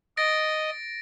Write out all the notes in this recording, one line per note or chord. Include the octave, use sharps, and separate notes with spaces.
D#5 A6 A#6 D7